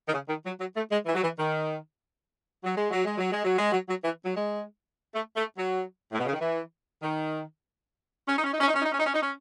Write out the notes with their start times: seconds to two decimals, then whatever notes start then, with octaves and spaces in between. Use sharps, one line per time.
0.06 D#3
0.12 C#3
0.28 D#3
0.44 F#3
0.59 F#3
0.75 A3
0.91 G#3
1.06 E3
1.14 F#3
1.22 E3
1.37 D#3
2.64 F#3
2.76 G#3
2.91 F#3
3.04 G#3
3.17 F#3
3.31 G#3
3.44 F#3
3.58 G#3
3.72 F#3
3.88 F#3
4.04 E3
4.24 F#3
4.36 G#3
5.14 A3
5.36 A3
5.56 F#3
6.12 A2
6.19 B2
6.26 C#3
6.33 D#3
6.39 E3
7.02 D#3
8.28 C#4
8.36 D#4
8.44 C#4
8.52 D#4
8.59 C#4
8.67 D#4
8.74 C#4
8.82 D#4
8.90 C#4
8.98 D#4
9.06 C#4
9.14 D#4
9.21 C#4